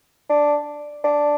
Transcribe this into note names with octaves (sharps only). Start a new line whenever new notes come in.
D4
D4